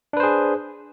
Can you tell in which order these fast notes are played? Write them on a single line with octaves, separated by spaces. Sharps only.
D4 B4 C5 G#4